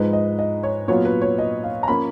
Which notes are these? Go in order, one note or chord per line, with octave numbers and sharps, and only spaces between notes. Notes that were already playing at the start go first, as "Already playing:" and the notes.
Already playing: G#2 F3 G#3 D#4 B4
D#5
D#5
C#5
A#2 F#3 B3 F4 C#5
B4
C#5
D#5
F5
A#5
F3 A#3 C#4 F4 B5